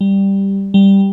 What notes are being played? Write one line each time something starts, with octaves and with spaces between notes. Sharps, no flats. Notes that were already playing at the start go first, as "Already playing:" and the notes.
G3
G3